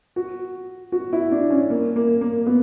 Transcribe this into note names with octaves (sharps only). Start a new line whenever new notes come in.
F#4
F#4
E4
D4
C#4
A#3
A#3
A#3
B3